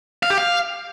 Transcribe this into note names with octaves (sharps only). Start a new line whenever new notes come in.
F5
G4
F5